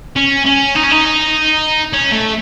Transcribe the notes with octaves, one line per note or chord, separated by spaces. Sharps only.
C#4
C#4
D#4
C#4
D#4
C#4
A3